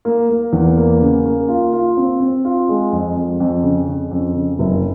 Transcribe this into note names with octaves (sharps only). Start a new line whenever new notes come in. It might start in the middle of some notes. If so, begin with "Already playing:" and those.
A#3
A#3
E2
A#3
C#3
A#3
F4
F4
C4
C4
F4
G#3
F2
F2
F2
C#3
C#3
F2
C#3
F#1